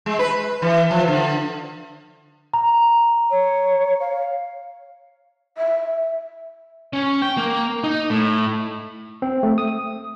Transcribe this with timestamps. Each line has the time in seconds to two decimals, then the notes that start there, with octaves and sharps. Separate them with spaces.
0.06 G#3
0.19 B4
0.62 E3
0.91 F3
1.08 D3
2.54 A#5
3.31 C#5
4.00 F5
5.58 E5
6.93 C#4
7.22 G5
7.37 A#3
7.84 D#4
8.10 A2
9.22 C4
9.43 A3
9.58 D#6